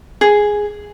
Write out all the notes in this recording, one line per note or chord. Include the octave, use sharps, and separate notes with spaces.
G#4